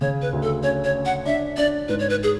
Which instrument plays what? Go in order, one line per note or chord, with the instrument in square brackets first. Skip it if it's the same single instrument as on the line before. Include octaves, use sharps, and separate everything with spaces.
[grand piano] C#3 [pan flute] C#5
[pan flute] B4
[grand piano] D2
[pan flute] A4
[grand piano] C#4 [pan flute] C#5
[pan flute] C#5
[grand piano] C#4
[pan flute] F#5
[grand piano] D4 [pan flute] E5
[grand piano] D4 [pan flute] D5
[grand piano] G#2 [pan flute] B4
[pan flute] C#5
B4
G#4